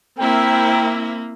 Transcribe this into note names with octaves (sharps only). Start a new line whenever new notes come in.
A#3 C4 E4 A#4 E5 G5